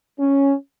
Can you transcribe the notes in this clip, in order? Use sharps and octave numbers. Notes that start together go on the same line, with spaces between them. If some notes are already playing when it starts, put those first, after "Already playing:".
C#4